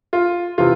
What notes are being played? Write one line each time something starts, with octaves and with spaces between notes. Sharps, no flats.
F4
C3 E3 F4